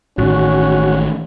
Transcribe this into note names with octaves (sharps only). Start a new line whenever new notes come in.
A1 A2 D#3 C#4 F#4